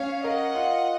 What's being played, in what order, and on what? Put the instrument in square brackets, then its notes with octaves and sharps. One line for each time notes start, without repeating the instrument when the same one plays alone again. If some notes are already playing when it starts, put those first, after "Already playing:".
Already playing: [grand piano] C#4 [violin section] C#5 F5
[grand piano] A#4 [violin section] D#5 F#5
[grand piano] F4